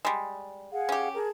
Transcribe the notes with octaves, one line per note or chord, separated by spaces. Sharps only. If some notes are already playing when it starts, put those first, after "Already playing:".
G3 G#3
G#4 F5 F#5
C#4 G4
G#4 A#4 A5